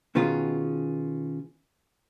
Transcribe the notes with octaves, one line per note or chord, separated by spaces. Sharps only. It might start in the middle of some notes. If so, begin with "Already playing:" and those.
B2 D#3 B3 C#4 F4 G#4